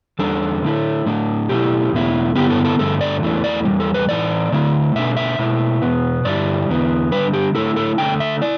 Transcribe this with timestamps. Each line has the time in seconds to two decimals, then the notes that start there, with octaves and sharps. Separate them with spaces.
0.19 E2 D3 G3 D4 A4
0.63 D3 A3 E4
1.06 A2 A3 D4
1.49 B2 A3 E4 G4
1.93 E2 B2 A3 E4
2.35 G2 D3 B3 E4 G4
2.50 A4
2.65 A4
2.79 G2 D3 A3 A4
3.01 D5
3.22 E2 E3 A3 D4
3.44 D5
3.65 E2 D3 G3
3.80 A4
3.94 B4
4.09 A2 E3 A3 D5
4.52 D3 A3 E4
4.95 B2 A3 D4 E5
5.17 E5
5.39 B2 A3 E4
5.82 E2 B2 B3
6.25 G2 D3 G3 E4 D5
6.69 E2 D3 B3 E4
7.12 D3 G3 D4 B4
7.34 G4
7.55 D3 A3 E4 A4
7.76 A4
7.98 D3 A3 D4 G5
8.20 E5
8.41 E4 D5